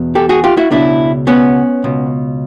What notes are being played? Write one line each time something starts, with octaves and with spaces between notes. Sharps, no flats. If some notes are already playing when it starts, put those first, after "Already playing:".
Already playing: E2 B2
G4 A4
F#4 G#4
F4 G4
E4 F#4
C#2 B2 D4 E4
B3 C#4
C#2 B2